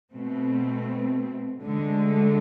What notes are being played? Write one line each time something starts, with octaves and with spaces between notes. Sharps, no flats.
B2 A3 C4
D2 D3 G#3